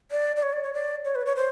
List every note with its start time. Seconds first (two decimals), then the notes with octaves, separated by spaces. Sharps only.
0.11 D5
0.36 D5
0.43 C#5
0.53 D5
0.64 C#5
0.74 D5
1.05 C#5
1.15 B4
1.26 C#5
1.36 C5